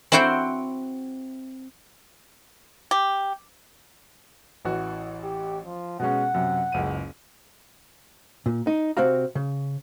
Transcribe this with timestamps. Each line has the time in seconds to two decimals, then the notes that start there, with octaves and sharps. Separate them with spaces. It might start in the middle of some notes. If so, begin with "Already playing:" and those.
0.12 C4 E4 F#4 C5 F#5 G5
2.91 G4
4.65 A1 E3 F#4
5.23 G4
5.65 F3
6.00 B2 G#3 C#4 F#5
6.34 F#2 C3
6.72 F#1 C#2 D#7
8.46 A#2
8.67 D#4
8.97 C3 C4 F#4 F5 A#5
9.35 C#3